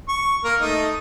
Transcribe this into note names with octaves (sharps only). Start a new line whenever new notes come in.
C#6
A#3 A#4
A3 D#4